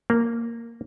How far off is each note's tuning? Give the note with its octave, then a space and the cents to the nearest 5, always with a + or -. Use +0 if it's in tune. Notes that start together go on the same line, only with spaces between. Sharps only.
A#3 -5